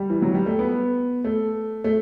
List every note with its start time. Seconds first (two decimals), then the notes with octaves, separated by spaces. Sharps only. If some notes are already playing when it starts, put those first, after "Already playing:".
Already playing: G3
0.10 E3
0.22 F#3
0.34 G3
0.46 A3
0.59 B3
1.24 A3
1.84 A3